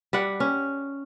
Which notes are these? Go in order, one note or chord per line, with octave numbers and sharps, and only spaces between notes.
G3 F#5
C#4